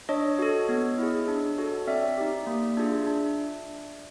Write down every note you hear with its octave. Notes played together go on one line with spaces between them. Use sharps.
D4 C#5 D#5
F#4 A4
B3
E4 G#4
D4
F#4 A4
C4 D5 E5
D#4 G4
A#3
D4 F4 G#4
D4